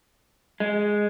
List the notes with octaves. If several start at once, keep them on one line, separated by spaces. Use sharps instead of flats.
G#3